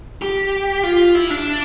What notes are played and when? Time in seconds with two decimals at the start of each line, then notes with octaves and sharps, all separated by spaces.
0.22 G4
0.83 F4
1.15 E4
1.30 D4